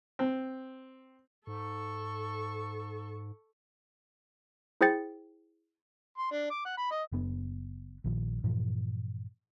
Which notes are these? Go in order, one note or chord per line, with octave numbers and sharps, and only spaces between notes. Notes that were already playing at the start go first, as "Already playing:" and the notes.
C4
G#2 A4 C#6
E4 G#4 C5 G5 A6 C#7
C6
D4
D6
F#5
B5
D#5
F#1 F#2 B3 D4
A#1 A#2 D#3 F3
G2 A#2 E3 F3